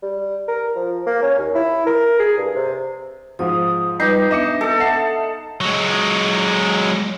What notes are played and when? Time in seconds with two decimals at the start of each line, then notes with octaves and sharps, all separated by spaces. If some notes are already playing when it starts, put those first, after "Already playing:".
0.03 G3
0.48 A#4
0.76 F3
1.06 A#3
1.22 C#4
1.38 D#2
1.55 E4
1.86 A#4
2.19 G#4
2.37 G2
2.55 C3
3.39 G#2 F3 D#6
4.00 G3 D#4 B4 D6
4.31 B3 D4 D#5 E5 D6 C#7
4.61 A4
4.80 E5 F#5 C7
5.61 F#3 G#3